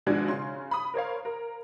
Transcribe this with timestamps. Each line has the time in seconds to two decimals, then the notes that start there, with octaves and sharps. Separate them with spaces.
0.06 G#1 B2 F3 G#3 D4 G#6
0.28 C#3 C6
0.71 B5 D#6
0.94 A#4 C5 C#5 F5
1.25 A#4